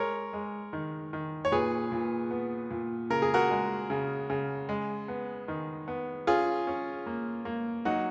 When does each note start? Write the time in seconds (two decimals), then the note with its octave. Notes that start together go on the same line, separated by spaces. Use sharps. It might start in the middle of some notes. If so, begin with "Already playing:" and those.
Already playing: G#3 A#4 C#5
0.33 G#3
0.73 D#3
1.13 D#3
1.45 C#5
1.52 A#2 G#4 B4
1.92 A#2
2.31 B3
2.71 A#2
3.10 C#3 A#4
3.22 G#4
3.34 F#4 A#4
3.51 G#3
3.90 C#3
4.30 C#3
4.69 G#3
5.08 B3
5.48 D#3
5.88 B3
6.27 C#4 F4 G#4
6.67 C#4
7.06 A#3
7.45 A#3
7.85 F#3 D#4 F#4